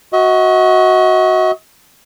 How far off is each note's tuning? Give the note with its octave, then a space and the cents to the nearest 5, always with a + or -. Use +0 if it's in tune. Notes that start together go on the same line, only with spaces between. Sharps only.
F#4 +0 D#5 +40